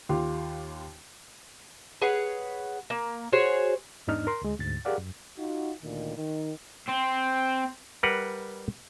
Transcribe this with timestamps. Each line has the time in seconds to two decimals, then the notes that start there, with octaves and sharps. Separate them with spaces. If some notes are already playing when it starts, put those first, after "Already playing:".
0.09 D#2 F4 G4
2.01 G#4 B4 C#5 F#5
2.90 A#3
3.33 F#4 G#4 C5 C#5
4.07 E2 G#2 B3 D4 D#4 F6
4.27 A#4 C6
4.41 D2 G#3
4.60 D2 G#2 A6
4.85 G4 G#4 A#4 D5 F5 F#5
4.98 F#2
5.38 D#4 F4 F#4
5.83 D2 A#2 D#3
6.16 D#3
6.88 C4
8.03 G3 A#4 B4 F#5